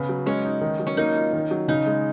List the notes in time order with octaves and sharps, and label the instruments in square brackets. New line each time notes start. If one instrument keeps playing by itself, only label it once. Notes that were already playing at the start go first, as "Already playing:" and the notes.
Already playing: [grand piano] C#3 [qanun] B3
[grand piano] F#3
[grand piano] G#3 [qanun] C#4
[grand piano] D#4
D#3
F#3
[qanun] C#4
[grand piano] A#3 [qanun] D#4
[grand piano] F4
D#3
F#3
[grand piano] C#3 [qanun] D#4
[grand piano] G#3